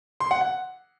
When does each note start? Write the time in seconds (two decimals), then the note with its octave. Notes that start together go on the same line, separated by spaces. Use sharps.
0.20 C6
0.31 F#5
0.41 F#5